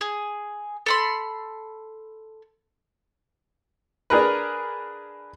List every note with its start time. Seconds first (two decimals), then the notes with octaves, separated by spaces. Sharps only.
0.01 G#4
0.86 A4 B5 C6
4.10 D4 G#4 A#4 B4